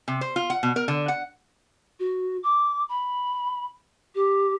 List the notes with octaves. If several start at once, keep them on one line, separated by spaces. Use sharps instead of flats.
C3
C5
F4
F#5
B2
A#4
D3
F#5
F#4
D6
B5
G4